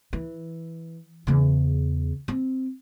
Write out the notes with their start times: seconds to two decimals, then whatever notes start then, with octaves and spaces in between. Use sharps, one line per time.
0.13 E3
1.27 E2 C#3
2.28 C4